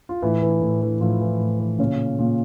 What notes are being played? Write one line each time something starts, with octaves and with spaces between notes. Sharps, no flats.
F4
A2 E3 E4
E3
A2
E3
A2 F3 F4
E3
A2
E3
A#2 C#3 C#4
A#2